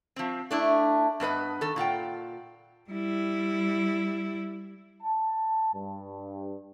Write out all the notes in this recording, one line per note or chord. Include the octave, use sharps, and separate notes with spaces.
F3 C4
A3 D4 E4
G2 B3 B4 D#5
D#3 A4
A#2 F4 F#5 G5
G3 E4
A5
G2